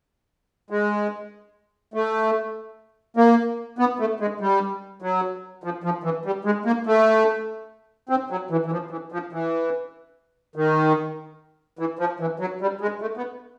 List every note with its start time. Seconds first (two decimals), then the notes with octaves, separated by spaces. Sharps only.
0.70 G#3
1.94 A3
3.17 A#3
3.79 B3
3.99 A3
4.20 G#3
4.41 G3
5.02 F#3
5.64 F3
5.84 F3
6.04 E3
6.25 G3
6.45 G#3
6.65 A#3
6.87 A3
8.09 C4
8.30 F#3
8.51 E3
8.66 E3
8.71 F3
8.91 E3
9.12 F3
9.33 E3
10.56 D#3
11.79 E3
11.99 F3
12.20 E3
12.40 F#3
12.61 G3
12.81 G#3
13.01 A3
13.17 B3